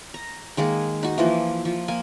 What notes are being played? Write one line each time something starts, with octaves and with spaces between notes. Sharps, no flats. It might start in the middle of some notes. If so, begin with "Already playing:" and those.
A#5
D#3 G#3 A#3 G#4
D#4 F#4
E3 F3 A#3
F3
A#3 G#5